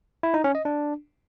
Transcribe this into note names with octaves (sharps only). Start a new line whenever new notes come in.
E4
D#4
C#4
D#5
D4